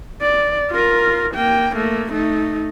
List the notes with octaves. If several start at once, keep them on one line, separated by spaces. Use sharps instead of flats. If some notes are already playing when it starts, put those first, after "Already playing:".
D5
F4 A#4
A#3 G5
A3 A#3
A3 D#4